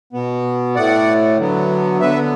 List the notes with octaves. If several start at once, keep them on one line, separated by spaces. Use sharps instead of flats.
B2 B3
A2 A3 D5 F#5
D3 F#3 B3
D3 B3 B4 E5